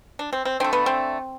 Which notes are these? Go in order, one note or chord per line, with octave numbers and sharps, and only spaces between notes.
D4
C4
C4
D3 A3 C4
B3
C4